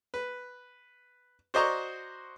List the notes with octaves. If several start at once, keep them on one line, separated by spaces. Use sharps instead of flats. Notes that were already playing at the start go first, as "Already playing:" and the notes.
B4
F#4 C5 D5 D#5 A#5 C#6